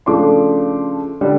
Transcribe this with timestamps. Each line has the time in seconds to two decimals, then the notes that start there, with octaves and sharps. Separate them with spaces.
0.06 C#3 F3 A3 D4 C6 D6
1.21 D3 G3